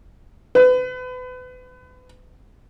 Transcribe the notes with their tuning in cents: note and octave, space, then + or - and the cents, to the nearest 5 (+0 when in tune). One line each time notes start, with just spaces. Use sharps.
B4 +35